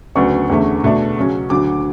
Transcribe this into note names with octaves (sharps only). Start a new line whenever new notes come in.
D2 C#3 F#3 B3 D4 C#6
E2 D3 A3 C#4
B2 A3 D4
C#3 F#3 C#4
D2 D3 F#3 D6